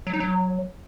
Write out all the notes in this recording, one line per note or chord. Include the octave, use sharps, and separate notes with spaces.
F#3
D#4
F#3